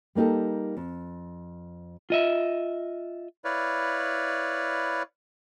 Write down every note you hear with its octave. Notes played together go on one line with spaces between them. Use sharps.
G3 A#3 D#4 G4 A4
F2
F4 D#5 E5
E4 B4 C#5 D5 F5